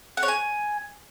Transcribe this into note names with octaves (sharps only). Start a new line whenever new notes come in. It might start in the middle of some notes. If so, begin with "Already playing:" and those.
F#5
C#5
G#5